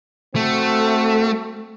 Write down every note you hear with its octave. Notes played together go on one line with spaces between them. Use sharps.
A3 C4 F#4 A4